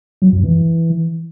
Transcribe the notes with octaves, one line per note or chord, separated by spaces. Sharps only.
F#3
F#2
E3